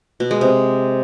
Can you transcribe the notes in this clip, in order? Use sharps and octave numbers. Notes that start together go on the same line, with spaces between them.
B2
G#3
C3